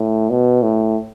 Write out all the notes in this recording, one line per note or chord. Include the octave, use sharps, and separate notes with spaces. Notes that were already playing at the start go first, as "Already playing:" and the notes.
Already playing: A2
B2
A2